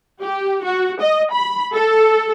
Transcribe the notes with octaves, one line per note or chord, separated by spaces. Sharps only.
G4
F#4
D#5
B5
A4